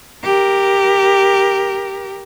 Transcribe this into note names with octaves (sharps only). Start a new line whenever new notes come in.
G4 A#4